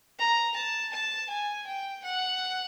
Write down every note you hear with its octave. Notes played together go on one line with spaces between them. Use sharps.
A#5
A5
A5
G#5
G5
F#5